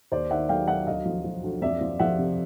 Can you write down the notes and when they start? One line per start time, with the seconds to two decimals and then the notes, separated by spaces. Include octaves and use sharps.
0.12 D#2 C5 D5
0.30 D#3 E5 F#5
0.49 F#3 F5 G5
0.68 F#3 E5 F#5
0.87 D2 D#5 F5
1.06 F3
1.24 F3
1.44 D2
1.62 F2 D5 E5
1.81 F3
1.99 F3 E5 F#5
2.19 C3